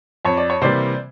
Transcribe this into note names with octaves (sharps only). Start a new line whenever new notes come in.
F2 C#5
D5
C#5
C3 E3 G3 A#3 C5 D5